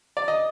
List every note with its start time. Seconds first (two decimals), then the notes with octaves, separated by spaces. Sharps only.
0.17 D5
0.28 D#5